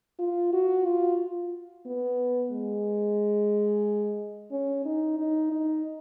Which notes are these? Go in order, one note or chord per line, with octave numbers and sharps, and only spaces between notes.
F4
F#4
F4
B3
G#3
C#4
D#4
D#4
D#4